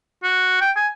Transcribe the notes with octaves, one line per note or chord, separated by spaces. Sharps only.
F#4
G5
G#5